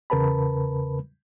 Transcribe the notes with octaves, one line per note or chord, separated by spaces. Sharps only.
E2 C#3 A#4 B4 A5 B5